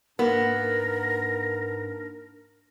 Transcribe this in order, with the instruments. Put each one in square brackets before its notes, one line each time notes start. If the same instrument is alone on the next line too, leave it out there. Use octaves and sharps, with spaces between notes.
[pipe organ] G#2 D4 [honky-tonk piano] A#3 [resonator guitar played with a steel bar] B3 [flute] A#4